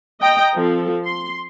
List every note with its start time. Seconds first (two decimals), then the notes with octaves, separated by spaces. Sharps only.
0.21 D#5 G5 A#5
0.54 F3 C4 A4
1.05 C6